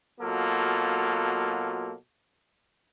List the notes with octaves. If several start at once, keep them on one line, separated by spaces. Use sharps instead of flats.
B2 F#3 A#3 F4 A4